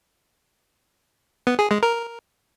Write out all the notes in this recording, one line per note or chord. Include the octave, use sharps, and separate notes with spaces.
B3
G#4
G#3
A#4